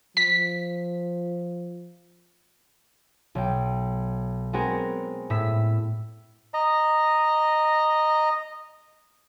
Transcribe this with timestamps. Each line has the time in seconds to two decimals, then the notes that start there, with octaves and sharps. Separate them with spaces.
0.17 F3 B6
3.35 B1 G5
4.53 G#3 B3 C4 F#4 G#4 A#4
5.30 A2 E6 B6
6.54 D#5 A#5